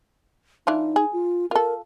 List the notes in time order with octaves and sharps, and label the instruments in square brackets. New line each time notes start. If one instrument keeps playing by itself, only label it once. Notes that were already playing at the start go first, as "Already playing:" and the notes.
[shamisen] E3 D4 F4 [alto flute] D#4
[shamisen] G#4
[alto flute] F4
[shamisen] F4 A4 [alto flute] A#4